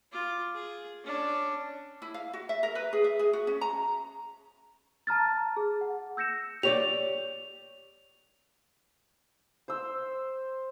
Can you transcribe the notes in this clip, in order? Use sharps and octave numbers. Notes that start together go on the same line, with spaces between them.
F4 D6
G#4
C#4 D4
E4
F5
F#4
E5
A#4
B4
G#4
E5
G#4
F#4
C#4
A#5
A5 A#5 F6 A6
G#4
F#5
E6 G6 A#6 C#7 E7
G4 C#5 D5 F7
C5 E6